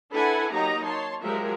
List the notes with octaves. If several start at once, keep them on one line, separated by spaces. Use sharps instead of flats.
D4 E4 A4 B4 F#5 G#5
F#3 A#3 D#4 G4 D#5 A#5
C#5 A5 C6
F3 F#3 G#3 G4 A#4 E5